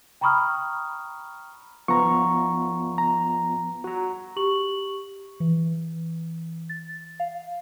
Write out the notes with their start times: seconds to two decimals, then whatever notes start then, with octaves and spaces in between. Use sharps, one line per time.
0.21 G5 A#5 B5 C#6 D#6 F6
1.88 F3 B3 F4 A#5 C#6
2.98 A#5
3.84 F#4 A#5
4.36 G4 C#6 F#7
5.40 E3
6.69 A6
7.20 F5